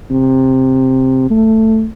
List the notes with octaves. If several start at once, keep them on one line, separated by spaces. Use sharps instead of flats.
C3
A3